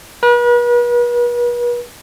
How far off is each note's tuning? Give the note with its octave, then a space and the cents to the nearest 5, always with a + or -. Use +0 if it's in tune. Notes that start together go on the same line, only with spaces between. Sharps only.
B4 -40